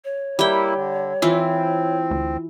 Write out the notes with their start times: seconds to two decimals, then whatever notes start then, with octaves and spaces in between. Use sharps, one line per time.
0.05 C#5
0.39 G3 A#3 E4 G5
0.74 D3
1.22 E3 C4 E4 F4
2.11 D2